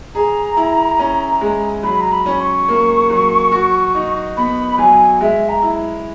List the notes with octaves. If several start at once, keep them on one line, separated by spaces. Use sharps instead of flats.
G#4 A#5
E4
C#4
G#3
F#3 B5
A#5
B5
C#4
C#6
A#3
F#3
F#4
D#4
B3 B5
F#3 G#5
G#3 E5
A#5
E4